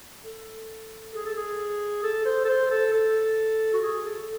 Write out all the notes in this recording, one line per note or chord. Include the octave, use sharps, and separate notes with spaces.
A4
G#4
A4
G#4
A4
C5
A4
C5
A4
A4
F#4
G#4
A4